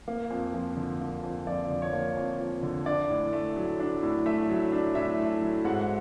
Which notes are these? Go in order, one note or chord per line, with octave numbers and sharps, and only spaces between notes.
A#3
F2
F3
D3
A#3
F2
F3 D5
D3
C#5
A#3
F2
F3
D3
D4 D5
A2
A3
F#3
D4
A2
A3 E5
F#3
D4
A2 E5
A3
F#3
G#2 F#5